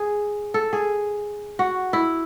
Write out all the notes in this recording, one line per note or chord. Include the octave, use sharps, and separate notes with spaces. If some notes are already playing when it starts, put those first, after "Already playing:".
Already playing: G#4
A4
G#4
F#4
E4